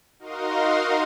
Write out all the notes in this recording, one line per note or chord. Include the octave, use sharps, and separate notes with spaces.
D#4 F#4 A#4 D#5 F5 C6